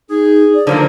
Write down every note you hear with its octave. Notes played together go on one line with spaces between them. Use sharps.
D#4 G#4
D5
D3 F3 F#3 A#3 C5